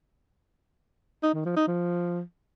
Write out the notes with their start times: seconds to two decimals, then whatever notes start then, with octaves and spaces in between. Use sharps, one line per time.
1.23 D#4
1.34 D#3
1.45 F3
1.56 D#4
1.67 F3